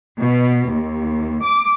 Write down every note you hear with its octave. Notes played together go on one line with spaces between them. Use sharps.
B2
D#2
D6